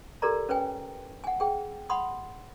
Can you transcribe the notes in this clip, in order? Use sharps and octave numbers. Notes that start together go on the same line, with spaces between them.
G4 A4 A#4 D5 A#5
C#4 B4 C#5 G5 G#5
F#5 G#5
G#4 G5
F#5 B5 C6 D#6